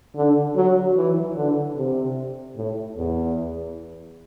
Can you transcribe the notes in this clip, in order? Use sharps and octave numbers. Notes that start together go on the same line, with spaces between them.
D3
F#3
E3
D3
C3
A2
E2